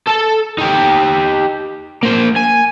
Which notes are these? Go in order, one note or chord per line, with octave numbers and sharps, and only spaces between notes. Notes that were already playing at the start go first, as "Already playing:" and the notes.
A4 A5
D#4 G4
A#3 C5
G#5